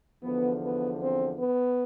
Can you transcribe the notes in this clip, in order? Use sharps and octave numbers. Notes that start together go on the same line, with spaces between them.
E2 D3 F3 B3
B3
C4
B3